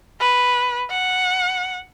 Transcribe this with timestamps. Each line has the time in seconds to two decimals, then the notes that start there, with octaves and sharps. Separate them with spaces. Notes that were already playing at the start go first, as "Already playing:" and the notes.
0.20 B4
0.90 F#5